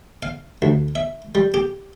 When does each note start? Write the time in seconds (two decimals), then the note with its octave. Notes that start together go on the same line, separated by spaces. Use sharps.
0.23 F5
0.62 D2
0.95 E5
1.35 G3
1.54 G4